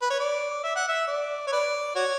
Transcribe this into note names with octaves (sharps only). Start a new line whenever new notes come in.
B4
C#5
D5
E5
F#5
E5
D5
C#5
B4 D5
F#4 C#5